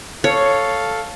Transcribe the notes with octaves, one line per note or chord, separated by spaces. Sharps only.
A4 C#5 F5